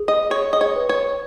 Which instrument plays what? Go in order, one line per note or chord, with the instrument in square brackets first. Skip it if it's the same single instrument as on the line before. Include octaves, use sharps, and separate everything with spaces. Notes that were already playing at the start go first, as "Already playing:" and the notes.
Already playing: [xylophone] G#4
[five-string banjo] D#5
[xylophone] G#4 [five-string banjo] C#5
[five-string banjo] D#5
C#5
[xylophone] B4
[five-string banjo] C#5